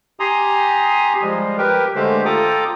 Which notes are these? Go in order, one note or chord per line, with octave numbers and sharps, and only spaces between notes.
G4 G#5 A#5 C6 D#6
F3 G3 G#3
G4 A#4 B4 G5
D3 G#3 A3 G4 C5
F4 A4 G5 A#5 D6 D#6